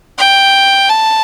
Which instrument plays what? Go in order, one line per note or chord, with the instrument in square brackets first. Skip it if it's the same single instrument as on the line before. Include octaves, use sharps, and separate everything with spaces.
[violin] G5
A5